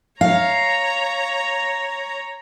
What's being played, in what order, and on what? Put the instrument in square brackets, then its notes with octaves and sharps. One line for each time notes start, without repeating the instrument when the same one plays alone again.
[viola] C#5 A#5 [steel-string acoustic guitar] F5